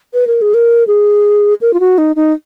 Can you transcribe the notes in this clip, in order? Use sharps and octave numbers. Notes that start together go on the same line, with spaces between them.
B4
A#4
G#4
A#4
G#4
A#4
F4
F#4
D#4
D#4